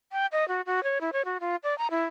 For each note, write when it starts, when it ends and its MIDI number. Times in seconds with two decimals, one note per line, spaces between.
0.12 0.26 79
0.32 0.47 75
0.48 0.61 66
0.66 0.83 66
0.83 1.01 73
1.01 1.10 64
1.13 1.25 73
1.25 1.38 66
1.40 1.56 65
1.64 1.76 74
1.78 1.87 82
1.91 2.06 64